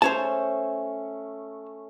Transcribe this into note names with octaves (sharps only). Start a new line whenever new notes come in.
A3 C#4 C5 C#5 A5